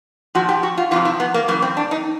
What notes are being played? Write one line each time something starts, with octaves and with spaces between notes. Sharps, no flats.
A#2 F3 F#4
G4
F#4
F4
F2 C3 F3 F4
E4
B3
A#3
F#2 C#3 E3 A#3
C4
D4
D#4